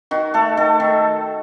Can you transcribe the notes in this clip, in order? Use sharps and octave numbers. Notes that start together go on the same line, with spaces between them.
D#3 F#4
A3 A4
D#3 A4
D#3